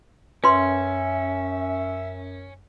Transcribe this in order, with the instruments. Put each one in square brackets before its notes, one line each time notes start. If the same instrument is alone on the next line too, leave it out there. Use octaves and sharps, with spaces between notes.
[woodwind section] F#2 [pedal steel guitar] C#4 [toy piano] B4 C6 [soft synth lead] E5